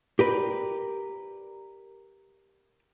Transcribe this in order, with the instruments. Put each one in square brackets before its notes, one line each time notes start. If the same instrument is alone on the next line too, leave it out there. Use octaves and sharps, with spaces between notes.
[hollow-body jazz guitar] G4 A#4 B4 D5